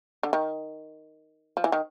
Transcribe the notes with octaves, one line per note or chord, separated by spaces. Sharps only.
D3
D#3
F3
E3
D#3